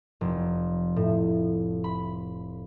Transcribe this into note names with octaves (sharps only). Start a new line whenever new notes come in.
F1
A2
B5